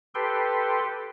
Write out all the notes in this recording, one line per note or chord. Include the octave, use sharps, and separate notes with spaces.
G4 A4 B4 G5 C6